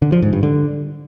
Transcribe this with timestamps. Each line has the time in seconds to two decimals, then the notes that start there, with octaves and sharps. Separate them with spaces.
0.02 D3
0.12 F3
0.22 G#2
0.33 G2
0.43 D3